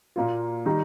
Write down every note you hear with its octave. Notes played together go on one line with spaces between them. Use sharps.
A#2 A#3 F4
D#3 G3 D#4